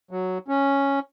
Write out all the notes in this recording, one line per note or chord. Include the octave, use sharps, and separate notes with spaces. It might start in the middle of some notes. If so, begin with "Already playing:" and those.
F#3
C#4